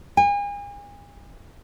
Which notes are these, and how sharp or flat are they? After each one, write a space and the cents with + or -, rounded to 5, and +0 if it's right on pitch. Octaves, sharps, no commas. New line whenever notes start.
G#5 -40